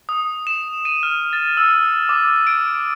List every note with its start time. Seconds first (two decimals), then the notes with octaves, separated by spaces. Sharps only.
0.09 D#6
0.47 E7
0.85 D#7
1.03 F6
1.33 A6
1.57 E6
2.09 D6
2.47 D7